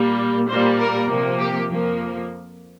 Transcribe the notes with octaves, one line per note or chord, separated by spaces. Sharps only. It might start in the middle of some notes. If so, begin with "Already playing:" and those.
Already playing: A#2 G3 A#3
A#2 G3 A#3 C5
A#4
C3 F3 A#3
G4
F2 F3 A#3